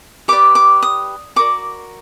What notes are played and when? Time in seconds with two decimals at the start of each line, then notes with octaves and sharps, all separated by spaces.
0.28 G4 B4 D5 D6
0.55 D6
0.83 D#6
1.36 F#4 A#4 D5 D6